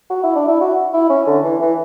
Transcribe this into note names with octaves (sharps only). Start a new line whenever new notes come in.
F#4
E4
D4
E4
F#4
E4
C#4
D3
E3
E3